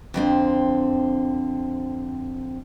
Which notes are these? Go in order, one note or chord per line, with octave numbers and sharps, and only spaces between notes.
F2 D3 C4